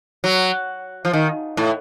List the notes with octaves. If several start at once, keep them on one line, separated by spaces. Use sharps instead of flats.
F#3
F3
D#3
A2